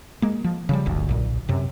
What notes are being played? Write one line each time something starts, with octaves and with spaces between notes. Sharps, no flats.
G#3 A#3
F3
C#3 F3 G3
D1 G1 D2
B1 A#2
F#2 C3